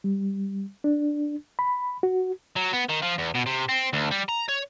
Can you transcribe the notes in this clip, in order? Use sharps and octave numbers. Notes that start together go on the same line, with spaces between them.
G3
D4
B5
F#4
F#3
B3
D#3
F3
E2
B2
C3
C4
D2
G3
A#5
C#5